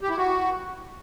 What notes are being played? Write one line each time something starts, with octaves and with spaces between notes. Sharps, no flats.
G4
E4
F#4